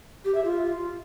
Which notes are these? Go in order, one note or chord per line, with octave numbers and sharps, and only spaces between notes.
G4
E5
F4